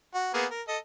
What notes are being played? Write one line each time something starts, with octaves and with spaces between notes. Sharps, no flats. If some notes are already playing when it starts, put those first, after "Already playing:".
F#4
A#3 B3 G#4
A#4
A4 D#5